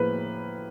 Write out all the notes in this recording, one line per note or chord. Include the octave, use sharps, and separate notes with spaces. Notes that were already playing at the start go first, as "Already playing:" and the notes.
Already playing: A2 F3 A#3 B4